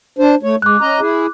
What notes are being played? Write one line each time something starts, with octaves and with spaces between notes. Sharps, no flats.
D4 C5
A3 C#5
G#3 D6 F#6
C#4 D#5 A#5
E4 G#4